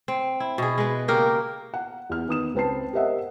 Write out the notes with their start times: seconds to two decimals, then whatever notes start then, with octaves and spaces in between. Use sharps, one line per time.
0.08 C4
0.40 E4
0.58 B2 G#4
0.78 G#3 B4
1.08 C#3 A#3 G4 A#4
1.74 F#5
2.10 E2 F6
2.27 D#3 B3 D#6 E7
2.54 C#2 C4 B4 A5 C7
2.93 G4 A#4 C5 D#5 E5 F#5